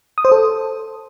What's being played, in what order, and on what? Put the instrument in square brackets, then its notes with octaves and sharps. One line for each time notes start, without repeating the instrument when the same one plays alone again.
[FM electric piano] D#6
C5
A4